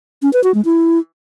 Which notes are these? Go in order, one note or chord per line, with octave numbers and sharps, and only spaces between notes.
C#4
B4
F#4
G#3
E4